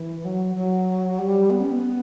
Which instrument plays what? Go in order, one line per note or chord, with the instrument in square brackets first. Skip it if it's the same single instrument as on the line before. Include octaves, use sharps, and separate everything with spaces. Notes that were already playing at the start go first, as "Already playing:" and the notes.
Already playing: [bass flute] E3
F#3
F#3
G3
B3
C#4
B3